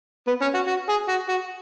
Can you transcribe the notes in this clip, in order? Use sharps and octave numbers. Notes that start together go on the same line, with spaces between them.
B3
C#4
F#4
F#4
G#4
F#4
F#4